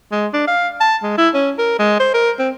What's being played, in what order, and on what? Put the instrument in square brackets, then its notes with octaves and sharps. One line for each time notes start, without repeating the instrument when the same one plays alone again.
[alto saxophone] G#3
D4
F5
A5
G#3
E4
C#4
A#4
G#3
C5
A#4
C4